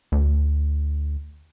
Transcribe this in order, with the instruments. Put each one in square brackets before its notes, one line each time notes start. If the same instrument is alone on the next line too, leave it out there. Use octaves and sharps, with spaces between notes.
[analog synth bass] D2